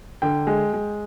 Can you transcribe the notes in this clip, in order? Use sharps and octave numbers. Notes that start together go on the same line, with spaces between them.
D3 G5
G#3
G#3